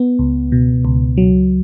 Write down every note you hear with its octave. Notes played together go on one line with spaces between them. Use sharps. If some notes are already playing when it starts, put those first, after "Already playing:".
Already playing: B3
C#2
B2
C#2
F#3